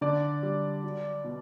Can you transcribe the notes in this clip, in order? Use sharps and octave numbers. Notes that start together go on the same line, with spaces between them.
D3 D5
G3
F#3
B2